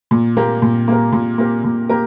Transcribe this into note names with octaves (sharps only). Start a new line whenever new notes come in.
A#2
A#3 G4 A#4
A#2
A#3 G4 A#4
A#2
A#3 G4 A#4
A#2
A#3 G4 A#4